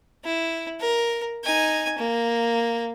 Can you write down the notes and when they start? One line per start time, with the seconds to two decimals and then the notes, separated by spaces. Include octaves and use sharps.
0.24 E4
0.80 A#4
1.44 D#4 G#5
1.98 A#3